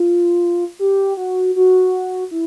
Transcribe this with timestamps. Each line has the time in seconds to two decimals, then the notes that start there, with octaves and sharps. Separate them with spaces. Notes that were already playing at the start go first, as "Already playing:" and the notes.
Already playing: F4
0.79 G4
1.17 F#4
1.56 F#4
2.31 E4